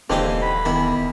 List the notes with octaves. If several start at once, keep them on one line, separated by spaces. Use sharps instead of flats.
D#1 D3 E3 A#3 C4 D#4 G4
B5
E2 D#3 E4